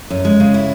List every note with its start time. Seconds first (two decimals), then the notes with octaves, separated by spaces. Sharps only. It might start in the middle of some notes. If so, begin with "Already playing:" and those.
0.10 F#2
0.25 G#3
0.40 C#3
0.54 E4